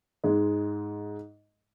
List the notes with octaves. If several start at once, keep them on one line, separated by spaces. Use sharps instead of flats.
G#2 G#3